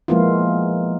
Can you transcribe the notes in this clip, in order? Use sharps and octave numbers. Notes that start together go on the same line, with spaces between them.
F3 G#3 A#3 B3 E4 F4